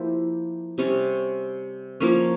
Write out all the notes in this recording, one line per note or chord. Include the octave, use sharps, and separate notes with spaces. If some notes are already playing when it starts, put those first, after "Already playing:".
Already playing: F3 A#3 E4 G4
C3 G3 C#4
F3 A#3 C#4